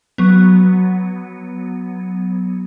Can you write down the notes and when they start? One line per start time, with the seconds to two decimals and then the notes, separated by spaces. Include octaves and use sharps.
0.18 F#3 B3